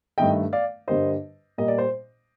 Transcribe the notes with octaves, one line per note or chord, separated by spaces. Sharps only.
G2 D#3 A3 D#5 G5
D5 F5
G2 D3 G3 A#3 C5 D#5
A#2 G3 A#3 D#5
D5
C5